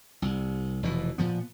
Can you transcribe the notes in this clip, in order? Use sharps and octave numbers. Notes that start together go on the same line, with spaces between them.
C2 C3
F1 B2 E3
A#2 F3 B3